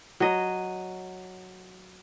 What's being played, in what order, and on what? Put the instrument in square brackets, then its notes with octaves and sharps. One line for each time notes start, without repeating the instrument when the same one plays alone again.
[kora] F#3 D#5